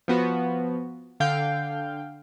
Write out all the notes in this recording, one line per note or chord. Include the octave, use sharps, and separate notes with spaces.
F3 B3 F#4
D3 F5 G5 G6